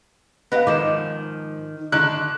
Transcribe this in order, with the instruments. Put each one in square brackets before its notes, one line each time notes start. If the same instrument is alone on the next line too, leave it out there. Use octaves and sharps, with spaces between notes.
[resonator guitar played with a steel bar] B3 G4 D#5 [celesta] B4 F5
[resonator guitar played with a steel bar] G#2 F3 [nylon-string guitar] D#3 [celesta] D6 G6 E7
[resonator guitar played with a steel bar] D3 D#3 D5 [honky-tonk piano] F#6